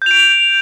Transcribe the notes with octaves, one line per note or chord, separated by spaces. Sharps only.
G6 D7 F7